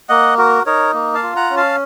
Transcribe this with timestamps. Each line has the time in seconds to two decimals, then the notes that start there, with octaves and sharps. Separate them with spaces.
0.09 A#3 D#5 F#5
0.38 F#4 A#4
0.66 D#4 A#4 C#5
0.94 A#3
1.15 F5 A5
1.23 F4
1.36 F#5 A#5
1.50 C#4
1.57 F5 A5